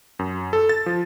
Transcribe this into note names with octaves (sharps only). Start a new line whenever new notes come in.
F#2
A4
A6
F3